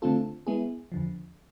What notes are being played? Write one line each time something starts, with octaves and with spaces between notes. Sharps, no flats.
D3 A3 C4 F4 A4
G#3 B3 E4 G#4
E2 D3 F3